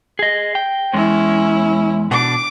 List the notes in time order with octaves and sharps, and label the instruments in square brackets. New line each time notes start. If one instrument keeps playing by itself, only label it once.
[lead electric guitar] G#4 D#5
G5
[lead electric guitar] E2 G#3 [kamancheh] C#4 E4
[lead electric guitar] B2 D4 [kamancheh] D6